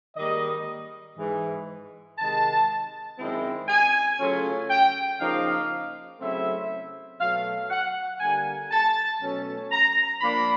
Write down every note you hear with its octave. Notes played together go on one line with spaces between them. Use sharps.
G#2 D#3 G3 A#3 D#5
G#2 E3 G#3
C3 D#3 G#3 A5
F#2 D#3 G#3 C4 E4
G#5
C#3 F#3 A3 C#4 F4
G5
C#3 F3 A#3 D#4 F5
C#3 F#3 A3 C4 E4 E5
B2 F#3 A3 F5
F#5
D3 G3 A#3 G#5
A5
B2 F#3 A3 C#4
A#5
F3 A#3 D4 B5